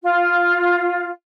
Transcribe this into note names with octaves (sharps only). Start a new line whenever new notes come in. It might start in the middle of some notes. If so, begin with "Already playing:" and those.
F4